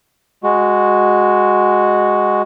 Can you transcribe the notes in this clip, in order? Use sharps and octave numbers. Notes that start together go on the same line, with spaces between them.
G#3 F#4